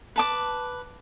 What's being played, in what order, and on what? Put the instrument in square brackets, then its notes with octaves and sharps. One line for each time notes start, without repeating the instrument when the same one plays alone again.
[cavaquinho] B4 A5 D6